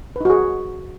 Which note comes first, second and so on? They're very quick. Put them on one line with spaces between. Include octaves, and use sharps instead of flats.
B4 D#4 F#4 G#4